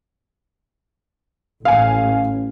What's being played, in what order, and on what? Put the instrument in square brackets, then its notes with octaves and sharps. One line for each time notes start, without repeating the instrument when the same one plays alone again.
[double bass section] A1 [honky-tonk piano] F5 G#5